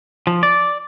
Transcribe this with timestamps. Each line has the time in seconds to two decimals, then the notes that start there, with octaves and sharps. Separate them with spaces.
0.27 F3
0.43 D5